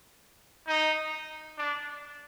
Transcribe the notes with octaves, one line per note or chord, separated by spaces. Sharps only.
D#4
D4